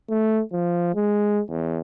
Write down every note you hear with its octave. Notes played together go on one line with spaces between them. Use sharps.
A3
F3
G#3
E2